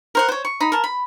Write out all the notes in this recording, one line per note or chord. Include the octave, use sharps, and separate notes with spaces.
A#4 C5 F#5
C5 C#5
C#6
D#4 B5
A#4 A5
B5